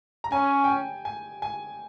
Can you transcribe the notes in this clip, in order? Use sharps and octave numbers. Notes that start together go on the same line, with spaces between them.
A#5
C#4 G#5
G5
G#5
G#5
G#5